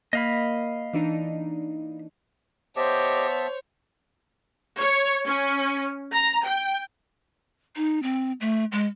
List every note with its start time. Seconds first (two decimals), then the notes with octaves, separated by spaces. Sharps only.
0.13 A#3 D#5 F5 B5
0.93 E3 D4 D#4
2.76 B3 G4 C5 C#5 D#5 E5 A5 D6
4.80 C#5
5.25 C#4
6.12 A#5
6.45 G5
7.76 D#4
8.03 C4
8.41 A3
8.72 G#3